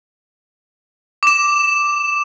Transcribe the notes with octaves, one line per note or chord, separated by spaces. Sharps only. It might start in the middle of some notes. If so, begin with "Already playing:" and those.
D6 E7